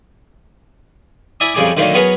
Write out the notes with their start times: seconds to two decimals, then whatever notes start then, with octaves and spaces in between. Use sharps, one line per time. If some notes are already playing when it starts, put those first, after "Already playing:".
1.40 E4 D5 E5 G#5 D#6
1.54 F2 C#3 G3 G#4 G#5 D6
1.77 D3 D#3 F#3 A3 A#3 D4
1.94 F#3 B3 C#4 G#4 A#4 B5